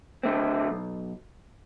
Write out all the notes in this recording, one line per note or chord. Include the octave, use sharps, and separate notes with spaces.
D3 A3 C4
B1